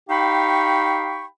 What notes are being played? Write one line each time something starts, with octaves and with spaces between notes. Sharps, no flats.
D#4 G4 F5 G5 B5 C#6